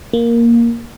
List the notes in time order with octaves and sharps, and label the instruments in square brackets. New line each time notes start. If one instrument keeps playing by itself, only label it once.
[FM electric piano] A#3